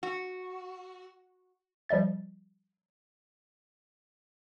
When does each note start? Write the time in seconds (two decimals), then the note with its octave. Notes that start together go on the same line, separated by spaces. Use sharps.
0.03 F#4
1.89 F3 G3 D#5 E5 A6